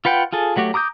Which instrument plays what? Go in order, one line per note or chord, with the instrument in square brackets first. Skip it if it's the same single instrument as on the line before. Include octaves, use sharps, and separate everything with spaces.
[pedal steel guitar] F4 B4 F#5 G5
F4 G#4 A4
F#3 A3 F#4 G4
A#5 D6 D#6 G6